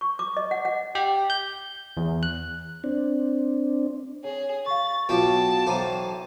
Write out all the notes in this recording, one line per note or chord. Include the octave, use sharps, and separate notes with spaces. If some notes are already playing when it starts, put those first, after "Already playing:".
C#6
D6
D#5
F#5
F#5
G4
G6
E2
F#6
C4 D4
G#4 C#5
F5 C#6 A6
B1 B2 F4 F5 G5 A5 D6
B1 E3 C5 G5 A#5 D#7